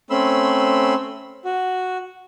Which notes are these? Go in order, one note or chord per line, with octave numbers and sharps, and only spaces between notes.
A3 C4 C#4 B5 C6 E6
F#4